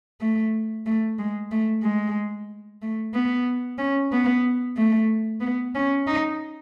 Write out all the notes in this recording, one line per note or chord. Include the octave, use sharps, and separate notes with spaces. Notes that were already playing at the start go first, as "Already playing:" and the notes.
A3
A3
G#3
A3
G#3
A3
B3
C#4
B3
A3
B3
C#4
D#4